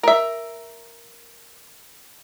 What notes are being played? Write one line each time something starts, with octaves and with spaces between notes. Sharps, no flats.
A#4 E5